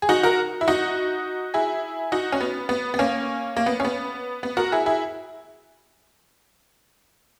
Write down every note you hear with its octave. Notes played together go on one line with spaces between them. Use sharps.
G#4
D#4 F#4
F#4 A#4
E4
D#4 F#4
E4 G#4
D#4 F#4
C#4
B3
B3
B3
A#3 C#4
A#3
B3
C#4
B3
B3
F#4 A#4
E4 G#4
E4 G#4